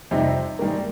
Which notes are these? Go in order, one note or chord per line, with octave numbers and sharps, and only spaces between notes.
F2 C3 G3 C4 D#4
G#2 D#3 G3 A#3